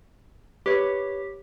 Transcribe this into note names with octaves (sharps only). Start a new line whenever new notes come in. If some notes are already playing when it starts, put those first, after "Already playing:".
G4 B4 C#5